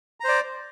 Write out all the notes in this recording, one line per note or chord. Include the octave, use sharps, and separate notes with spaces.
C5 D5 A#5